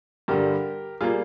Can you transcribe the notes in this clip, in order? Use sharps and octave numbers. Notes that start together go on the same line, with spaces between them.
G2 D3 G3 G4 A#4
G3 A#3 F4 G#4